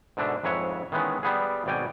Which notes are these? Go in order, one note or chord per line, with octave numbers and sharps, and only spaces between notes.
G#2 B2 D3 D4 E5
F2 G#2 B4 C#5 E5
D#3 E3 G#3 B3 C#4
G3 B3 G#4
G#1 B2 D5 G5 G#5